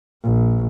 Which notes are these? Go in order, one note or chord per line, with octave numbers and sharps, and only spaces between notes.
A#1